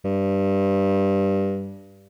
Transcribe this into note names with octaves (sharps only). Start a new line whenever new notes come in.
G2